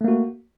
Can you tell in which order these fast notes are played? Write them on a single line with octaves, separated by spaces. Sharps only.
A3 A#3 F#4